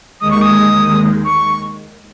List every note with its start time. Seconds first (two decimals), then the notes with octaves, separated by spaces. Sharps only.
0.20 D#2 D#3 G#3 D#6
0.30 C#6
0.41 D#6
1.24 C#6